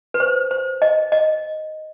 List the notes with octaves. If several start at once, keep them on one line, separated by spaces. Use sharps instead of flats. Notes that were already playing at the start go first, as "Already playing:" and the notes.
B4
C5
C5
D#5
D#5